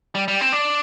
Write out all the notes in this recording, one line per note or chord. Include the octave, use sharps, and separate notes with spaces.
G3
G3
C4
D4